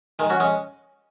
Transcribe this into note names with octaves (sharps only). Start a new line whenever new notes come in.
D#3 G#3
C#4 F#4
G#3 C#4